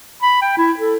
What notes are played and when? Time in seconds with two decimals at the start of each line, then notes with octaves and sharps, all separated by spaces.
0.22 B5
0.42 G5
0.58 E4
0.79 A4